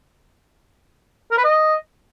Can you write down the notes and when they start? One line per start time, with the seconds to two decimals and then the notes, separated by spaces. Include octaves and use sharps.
1.31 A#4
1.37 B4
1.44 D#5